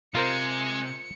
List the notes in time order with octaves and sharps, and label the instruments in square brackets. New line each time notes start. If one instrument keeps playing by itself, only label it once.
[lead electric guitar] C3 [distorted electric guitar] G#3 [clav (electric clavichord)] F4 A#4 C5 [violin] C#7